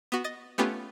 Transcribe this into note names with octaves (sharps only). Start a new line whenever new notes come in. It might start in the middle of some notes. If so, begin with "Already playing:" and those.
B3 F#4
D#5 A6
A3 B3 C#4 F4 G4 B4